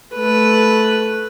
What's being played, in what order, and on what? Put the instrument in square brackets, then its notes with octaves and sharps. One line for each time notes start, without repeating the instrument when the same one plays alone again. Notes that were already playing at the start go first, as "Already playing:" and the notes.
[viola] A3 B4